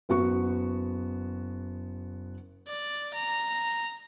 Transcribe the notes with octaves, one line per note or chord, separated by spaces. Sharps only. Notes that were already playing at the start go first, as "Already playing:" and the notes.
F#1 B3 F#4 C#6
D5
A#5